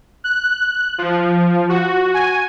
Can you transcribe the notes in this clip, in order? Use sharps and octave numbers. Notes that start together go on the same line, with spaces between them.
F#6
F3
F#4
G#5